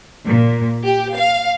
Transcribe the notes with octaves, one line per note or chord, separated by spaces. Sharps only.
A#2
G4
F5